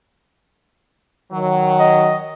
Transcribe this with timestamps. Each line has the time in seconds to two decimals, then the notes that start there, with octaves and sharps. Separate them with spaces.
1.32 D#3 F#3
1.80 D#5